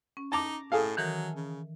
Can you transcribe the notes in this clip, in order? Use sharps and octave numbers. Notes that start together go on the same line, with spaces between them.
C#4
D#4 A5 A#5 D6
A2 G#4 A4 F5
D#3 E3 F#3 A#4
C#3